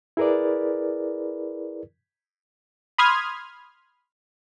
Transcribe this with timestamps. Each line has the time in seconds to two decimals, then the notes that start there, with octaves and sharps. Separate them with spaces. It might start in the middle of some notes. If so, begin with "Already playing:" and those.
0.17 E4 G#4 A#4 B4 D5
2.98 B5 C6 D#6 F6 G#6